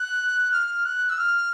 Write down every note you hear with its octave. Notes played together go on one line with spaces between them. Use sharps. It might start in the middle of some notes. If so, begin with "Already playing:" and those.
Already playing: F#6
F6
F#6
E6
F6